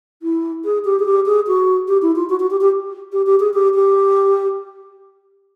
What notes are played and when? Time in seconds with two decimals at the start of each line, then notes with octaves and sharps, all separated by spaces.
0.22 E4
0.64 G#4
0.84 G4
0.99 G#4
1.05 G4
1.25 G#4
1.47 F#4
1.87 G4
2.02 E4
2.15 F4
2.29 F#4
2.39 F#4
2.50 G4
2.60 G4
3.12 G4
3.26 G4
3.39 G#4
3.53 G4
3.74 G4